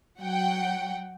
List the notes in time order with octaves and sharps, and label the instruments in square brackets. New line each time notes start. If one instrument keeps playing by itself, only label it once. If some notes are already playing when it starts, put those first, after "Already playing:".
[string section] F#3 F#5 G5